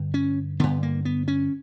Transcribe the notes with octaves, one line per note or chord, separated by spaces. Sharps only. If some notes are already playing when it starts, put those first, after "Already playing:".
Already playing: G2 D3
C#4
G2 D3 B3
A#3
B3
C#4